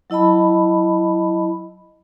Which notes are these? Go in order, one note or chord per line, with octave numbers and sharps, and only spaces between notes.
F#3 E4 D#5 A5 B5